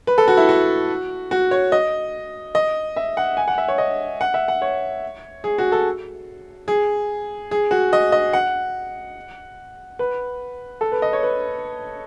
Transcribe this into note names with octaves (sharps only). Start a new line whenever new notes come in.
B4
A4
F#4
E4
F#4
F#4
C#5
D#5
D#5
E5
F#5
G#5
F#5
E5
C#5
D#5
F#5
E5
F#5
C#5
G#4
F#4
A4
G#4
G#4
F#4
D#5
D#5
F#5
B4
A4
B4
D#5
C#5
B4